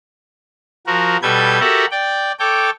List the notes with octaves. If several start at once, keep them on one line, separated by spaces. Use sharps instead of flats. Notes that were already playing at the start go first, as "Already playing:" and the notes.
F3 F#4 A#4
B2 G3 A4 B4 G6 G#6
F#4 G4 A4 A#4 E5 F#5
D5 G5
A4 C#5 G5 D6